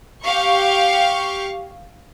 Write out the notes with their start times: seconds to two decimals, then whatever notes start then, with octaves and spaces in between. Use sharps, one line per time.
0.24 G4 F5 C#6